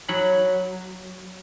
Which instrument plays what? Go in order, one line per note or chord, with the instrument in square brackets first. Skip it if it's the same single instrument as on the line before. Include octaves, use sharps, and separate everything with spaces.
[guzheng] F#3 F#5 B5